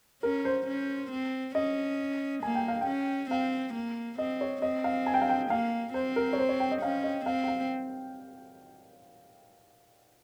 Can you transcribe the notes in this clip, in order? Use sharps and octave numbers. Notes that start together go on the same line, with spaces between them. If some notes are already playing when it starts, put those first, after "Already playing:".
C#4 A#4
C5
C#4
C4
C#4 D#5
A#3 G#5
G5
F5
G5
C#4
C4 F5
A#3
C4 D#5
C#5
C4 D#5
F5
G#5
G5
F5
G5
A#3 F5
C4 C5
A#4
C#5
C5
C#5
G5
D#5
C#4 F5
D#5
C4 F5
G5
F5